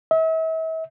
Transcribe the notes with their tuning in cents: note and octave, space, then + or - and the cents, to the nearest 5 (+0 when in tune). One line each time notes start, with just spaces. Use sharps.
E5 -40